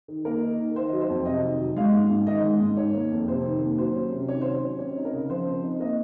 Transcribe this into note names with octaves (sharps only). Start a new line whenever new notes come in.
D#3
A#3 A#4
D#4
D#3
D#3 C5
D#5
F#3
C5
F2
C3 D#5
D#3
F#3
G#3 F5
G#2
G#2
D#3 D#5
G#3
G#2
D#3 C#5
A#3
F2
C3 C5
D#3
A#3
F#3 C5
C#4
C3
D#3 C#5
F#3 C5
C#5
C#4
C4 C#5
D#4
A#4
C#3
F3 C5
C4
D#4
A#3 D#5